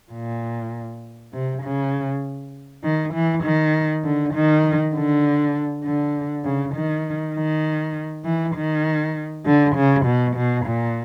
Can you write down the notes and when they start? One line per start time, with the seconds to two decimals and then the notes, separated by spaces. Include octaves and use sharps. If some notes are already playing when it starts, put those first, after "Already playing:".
0.13 A#2
1.33 C3
1.63 C#3
2.84 D#3
3.13 E3
3.44 D#3
4.04 D3
4.34 D#3
4.95 D3
5.84 D3
6.44 C#3
6.75 D#3
7.35 D#3
8.25 E3
8.56 D#3
9.46 D3
9.76 C#3
10.06 B2
10.36 B2
10.66 A#2